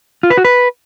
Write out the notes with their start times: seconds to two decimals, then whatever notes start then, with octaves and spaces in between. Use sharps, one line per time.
0.23 F4
0.30 B4
0.37 F#4
0.45 B4